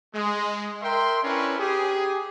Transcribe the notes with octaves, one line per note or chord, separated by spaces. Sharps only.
G#3
A#4 E5 G5 C6
C#4 D4 E4 A#4 B4 C#5
G4 G#4